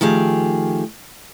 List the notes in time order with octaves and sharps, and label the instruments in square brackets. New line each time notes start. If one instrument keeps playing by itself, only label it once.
[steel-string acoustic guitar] D#3 F3 A3 G4 G#4